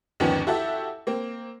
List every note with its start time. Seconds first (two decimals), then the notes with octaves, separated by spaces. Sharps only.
0.20 G1 D#2 D#3 F3 B3 C#4
0.47 E4 F#4 G4 A4 E5
1.07 A#3 C4